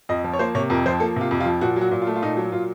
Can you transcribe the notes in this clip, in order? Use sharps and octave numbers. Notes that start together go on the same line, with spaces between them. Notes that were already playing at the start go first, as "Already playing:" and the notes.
F2 D#5
F3
C#5
A#3 C5
C3 C#5
F2 A#4
F3 C5
A#3 A4
C3 F4
F2
F4
F3
A#2 F#4
F#3
F#4
A#2
F4
A3
F4
A#2 D#4
F#3
A#2 F4